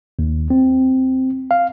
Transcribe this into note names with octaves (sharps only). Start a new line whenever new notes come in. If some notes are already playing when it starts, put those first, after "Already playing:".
D#2
C4
F5